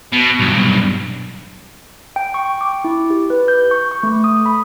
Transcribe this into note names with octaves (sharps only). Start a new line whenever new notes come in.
B2
B1 G2
G5
C#6
D6
E4
G4
B4
G6
C#6
C#6
A3
D#6
B5